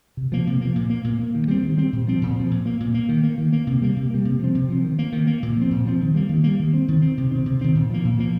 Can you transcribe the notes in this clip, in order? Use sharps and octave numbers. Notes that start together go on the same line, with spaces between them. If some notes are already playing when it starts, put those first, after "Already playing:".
C3
F3 A#3
C3
F3 A#3
A#2
A#3
A#2
A#3
D#3
G3 C4
D#3
G3 C4
A#2
F3 C4
A#2
F3 C4
A#2
A#3
A#2
A#3
D#3
A#3
D#3
A#3
C3
G3 A#3
C3
G3 A#3
C3
F3 C4
C3
F3 C4
D#3
A#3
D#3
A#3
A#2
F3 C4
A#2
F3 C4
D#3
G3 A#3
D#3
G3 A#3
D#3
C4
D#3
C4
C3
D#3 C4
C3
D#3 C4
A#2
F3 A#3
A#2
F3 A#3